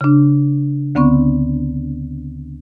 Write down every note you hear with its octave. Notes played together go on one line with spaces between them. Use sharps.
C#3 D4
D2 D3 B3 C4 C#6